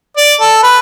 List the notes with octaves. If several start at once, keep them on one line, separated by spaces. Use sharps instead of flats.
D5
A4
B4